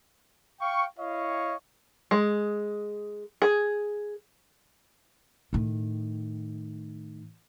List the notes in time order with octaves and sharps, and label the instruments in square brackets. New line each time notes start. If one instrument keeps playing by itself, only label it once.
[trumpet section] F5 G5 C#6
E4 C#5 D#5 F5 C#6
[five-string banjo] G#3
G#4
[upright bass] A2 D#3